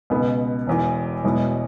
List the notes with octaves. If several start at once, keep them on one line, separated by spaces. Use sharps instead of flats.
C#2 B2 B3 G#4
E1 E2 E3
E1 E2 B2 G#3 E4